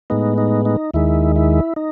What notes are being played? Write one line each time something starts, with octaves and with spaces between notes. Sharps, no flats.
A2 G#3 B3 D#4
D#4
D#4
D#2 D#3 G#3 E4
E4
D#4